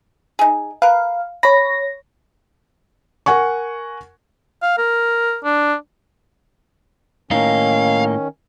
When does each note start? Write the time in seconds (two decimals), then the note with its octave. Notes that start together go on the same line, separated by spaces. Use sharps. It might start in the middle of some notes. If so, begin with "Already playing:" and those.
0.39 D#4 G#4
0.82 A#4 B4 F5
1.43 C#5 B5 A#6
3.26 A#4 F#5 G#5 C#6
4.62 F5
4.78 A#4
5.44 D4
7.31 A2 D#3 A#3 C#4 D#4 F5